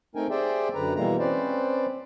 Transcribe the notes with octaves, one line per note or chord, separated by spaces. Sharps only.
A3 C4 D#4 A#4 G5 G#5
G4 G#4 C5 D5 E5 G5
F#2 D3 B4 A#5
B2 E3 G3 G#3 A#3 A#5
C4 C#4 B4 C5 D5